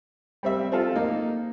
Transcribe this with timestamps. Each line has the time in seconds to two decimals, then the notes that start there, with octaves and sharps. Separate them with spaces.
0.43 G3 C4 E5
0.72 C4 F4 A4 F5
0.95 A#3 D#4